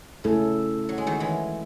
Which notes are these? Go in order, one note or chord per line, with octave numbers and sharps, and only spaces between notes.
C#3 A3 E4 A4
F#3
G#3
D#3 F#3
E3 G#3